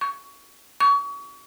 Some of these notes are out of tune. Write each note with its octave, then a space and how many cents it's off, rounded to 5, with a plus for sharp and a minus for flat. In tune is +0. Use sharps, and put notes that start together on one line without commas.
C#6 +20
C#6 +35